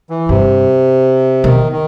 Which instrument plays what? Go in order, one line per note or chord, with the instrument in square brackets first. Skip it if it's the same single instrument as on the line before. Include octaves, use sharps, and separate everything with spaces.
[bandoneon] E3
[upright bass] G2 [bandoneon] C3
[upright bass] B2 [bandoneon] D#3
[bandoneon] D#3